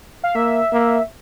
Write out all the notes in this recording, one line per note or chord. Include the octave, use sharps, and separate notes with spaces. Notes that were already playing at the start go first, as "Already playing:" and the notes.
F5
A#3 E5
A#3